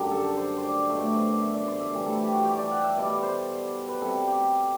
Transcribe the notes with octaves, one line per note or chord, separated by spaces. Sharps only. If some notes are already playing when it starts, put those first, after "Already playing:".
Already playing: F#2 D3 G3 G4
A4
C5
C5
D5
B2 A3 E5
D5
C5
D5
E5
D5
C5
E5
A2 E3 G3
A4
G4
F#4
G4
D5
F#5
E5
B2 G3 D5
C5
B4
C3 G3 A4
G4